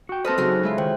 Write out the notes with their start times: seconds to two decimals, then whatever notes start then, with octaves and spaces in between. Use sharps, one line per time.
0.09 F#4 G5
0.25 C4 A4 B4 C5 D#5 A5 F6 A#6
0.38 C#3 F#3 A3 D#4 F#4 G#4
0.63 G#3 E4 F4
0.78 D#3 C5 G5